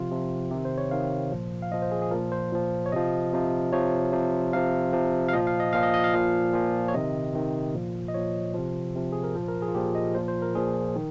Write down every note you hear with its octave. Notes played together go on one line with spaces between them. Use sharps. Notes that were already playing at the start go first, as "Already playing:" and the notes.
Already playing: C3 F3 F4
C3 F3
C3 D#3 G4
C5
C#5
C3 D#3 F5
A#2 F3
F5
A#2 F3 D#5
C5
G#4
G#4
A#2 F3 A#4
C5
A#2 F3
C#5
C3 F3 D#5
C3 F3
C3 F3 C#5
C3 F3
C3 F3 F5
C3 F3
F5
A#2 F3 D#5
F5
D#5
A#2 F3 F5
D#5
D#5
F5
A#2 F3
A#2 F3
C#5
C3 D#3 D#5
C3 D#3
A#2 F3
D#5
A#2 F3 C#5
C3 F3
C3 F3
G#4
A#4
A#2 F3 C5
A#4
G#4
F4
A#2 F3 G4
D#5
A#2 F3 C5
C5
A#4
A#2 F3 G#4
D#3